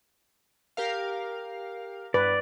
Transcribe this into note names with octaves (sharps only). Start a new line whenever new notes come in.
G4 A#4 F5
G2 B4 D5